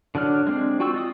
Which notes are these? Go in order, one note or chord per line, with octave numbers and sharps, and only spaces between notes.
D3 F#3 D4 F6
G#3 C4 D4
F4 F#4 G5 C#6 E6
F4 D#5 D#6